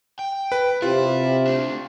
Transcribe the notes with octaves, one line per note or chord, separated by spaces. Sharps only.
G5
B4
C3 E4 F4
A3 D4